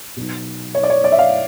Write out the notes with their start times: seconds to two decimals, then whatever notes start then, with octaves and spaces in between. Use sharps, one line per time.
0.16 B2 F#3 B3 D#4
0.75 C#5
0.83 D5
0.90 C#5
1.04 D5
1.12 E5
1.18 F5